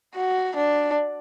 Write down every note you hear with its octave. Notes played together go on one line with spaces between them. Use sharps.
F#4
D4